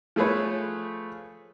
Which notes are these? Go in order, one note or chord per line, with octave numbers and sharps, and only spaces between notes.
F3 A3 G#4 B4 C#5